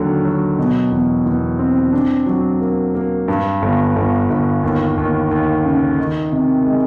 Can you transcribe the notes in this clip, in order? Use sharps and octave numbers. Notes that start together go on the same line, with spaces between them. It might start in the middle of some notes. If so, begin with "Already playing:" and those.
Already playing: D#2 D3 F#3
F#3
B2
E2
E2
C4
D4
F#3
A#3
A#3
G2
G1
G1
G1
D#2
D#2
D#2
C#3
D#3
C3
G#3